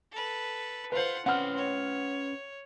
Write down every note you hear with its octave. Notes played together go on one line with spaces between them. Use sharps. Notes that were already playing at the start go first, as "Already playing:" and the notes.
A4 B4
F4 B4 C5 F#5
C4 C#4 B4 F#5 F6
C#5